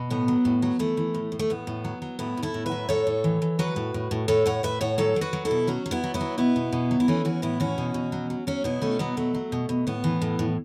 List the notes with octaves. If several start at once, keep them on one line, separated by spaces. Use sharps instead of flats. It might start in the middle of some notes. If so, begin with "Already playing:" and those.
Already playing: B2
A2 B3
F#3
A2
F#3
E3 A3
E3
A2
A2
A3
A2 B3
A2
F#3
F#3
A2 B3 E4
A2
E4 A4
A2
B4 E5
F#3
A2 A4 C#5
A2
E3
E3
F#3 F#4 B4
A2
A2
A2
A2 A4 C#5
A2 C#5 F#5
A2 B4 E5
A2 C#5 F#5
F#3 A4 C#5
F#3
F#4 B4
F#3
E4 A4
B2
F#3 C#4 F#4
F#3
B3 E4
F#3
B3 E4
F#3
B2 B3 E4
B2
B2
F#3
E4
E3 A3 C#4
E3 C#4 F#4
A2 B3 E4
E3 C#4 F#4
B2
B2
F#3
F#3
F#3 C#4 F#4
B2 B3 E4
B2 A3 C#4
F#3 B3
B2 A3
F#3
B2
B2
A2 B3
E3
A2
A2